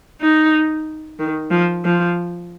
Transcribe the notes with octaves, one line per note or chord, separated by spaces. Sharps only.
D#4
D#3
F3
F3